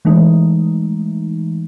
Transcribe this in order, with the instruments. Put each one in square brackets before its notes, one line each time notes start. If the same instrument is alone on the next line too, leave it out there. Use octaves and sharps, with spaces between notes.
[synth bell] E3 G#3 A3 D#4